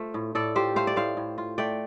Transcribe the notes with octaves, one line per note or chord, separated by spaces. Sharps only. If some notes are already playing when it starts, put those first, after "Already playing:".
Already playing: A3 F4 C5 F5
A2
A2 A4 D5
F4 G4 C5
A3 C5 F5
D5
A2 C5 F5
A2
F4
A3 D5 G5